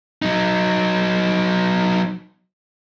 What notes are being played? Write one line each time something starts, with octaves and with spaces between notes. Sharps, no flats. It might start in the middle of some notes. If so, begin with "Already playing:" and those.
F#3 D#4